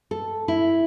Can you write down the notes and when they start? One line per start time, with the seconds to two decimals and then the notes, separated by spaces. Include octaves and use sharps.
0.11 A4
0.48 E4